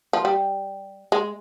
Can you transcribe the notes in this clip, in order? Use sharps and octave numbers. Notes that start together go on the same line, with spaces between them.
F3
G3
G#3